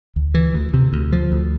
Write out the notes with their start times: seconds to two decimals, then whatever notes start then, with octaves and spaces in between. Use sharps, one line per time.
0.16 D2
0.34 E3
0.54 D2
0.74 C3
0.93 D2
1.12 F3
1.32 D2